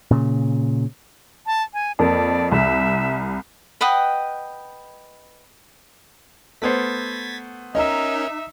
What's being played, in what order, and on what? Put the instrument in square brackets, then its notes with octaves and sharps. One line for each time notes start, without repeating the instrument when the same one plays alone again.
[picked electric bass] A#2 C#3
[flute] A5
G#5
[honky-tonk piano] F2 A#3 [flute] D5
[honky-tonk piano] C2 [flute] E5
[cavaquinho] B4 D#5 F#5 G5
[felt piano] A3 B3 C5 [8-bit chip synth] G#6 A6 B6
[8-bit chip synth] C#4 A#4 [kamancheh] D#4 E5 [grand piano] D#5 A#5